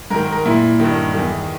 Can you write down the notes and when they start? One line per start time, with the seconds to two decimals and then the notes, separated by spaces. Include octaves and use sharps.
0.10 G#2 D#3 A#4
0.32 A#4
0.45 A#2 E4
0.80 G2 D#3
1.14 E2 D#3